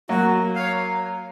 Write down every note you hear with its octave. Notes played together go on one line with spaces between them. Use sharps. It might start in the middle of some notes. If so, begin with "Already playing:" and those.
F#3 A#3 F#4
C#5 F5